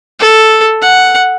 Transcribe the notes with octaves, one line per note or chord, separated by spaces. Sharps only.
A4
F#5